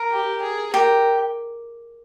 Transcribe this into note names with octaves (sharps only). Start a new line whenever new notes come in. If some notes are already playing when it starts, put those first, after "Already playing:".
Already playing: A#4
G4
G#4
G4 A#4